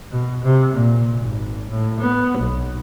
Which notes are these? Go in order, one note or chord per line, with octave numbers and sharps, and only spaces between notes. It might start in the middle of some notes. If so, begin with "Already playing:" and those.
B2
C3
A#2
G#1
A2
B3
B1